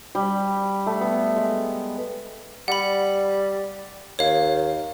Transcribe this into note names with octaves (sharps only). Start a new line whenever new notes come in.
G3
A3
B3
G#3
G3 F#5 B5
D#2 C#5 F5